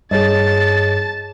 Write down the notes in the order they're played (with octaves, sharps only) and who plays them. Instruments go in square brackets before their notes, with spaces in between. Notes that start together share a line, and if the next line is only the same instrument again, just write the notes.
[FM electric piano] G2 [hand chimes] G#4 C#5 D#5 [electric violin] A5 A6